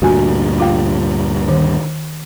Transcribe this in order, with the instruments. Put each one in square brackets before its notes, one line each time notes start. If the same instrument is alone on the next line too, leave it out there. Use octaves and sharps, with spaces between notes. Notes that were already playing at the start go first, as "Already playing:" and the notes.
[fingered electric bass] D2 G2 A#2 [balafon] F#4 G#5
[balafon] F4 F5 G5
D#3